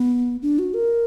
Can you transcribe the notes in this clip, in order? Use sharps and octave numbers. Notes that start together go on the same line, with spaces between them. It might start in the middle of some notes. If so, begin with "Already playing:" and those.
Already playing: B3
D4
F#4
A#4